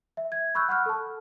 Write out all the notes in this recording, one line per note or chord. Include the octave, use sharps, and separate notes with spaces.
E5
G#6
B5 C#6 E6 F#6 G6
F#5 B5 C#6 F6 F#6
A4 A5